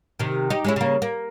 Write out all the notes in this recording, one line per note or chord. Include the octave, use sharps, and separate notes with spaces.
C3 D#3
D#4 G4
G#3 C#4 E4
C#3 A#3
A#3